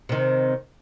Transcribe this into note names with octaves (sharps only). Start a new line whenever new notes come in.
C3 D#3